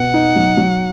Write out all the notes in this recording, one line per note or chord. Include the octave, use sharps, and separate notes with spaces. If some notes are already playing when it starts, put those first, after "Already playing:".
Already playing: B2 B3 F#5
D#4
F#3
F#3